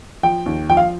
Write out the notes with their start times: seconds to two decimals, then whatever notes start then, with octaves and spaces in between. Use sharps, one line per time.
0.23 F3 G5
0.46 D#2
0.70 F3 G5
0.77 F5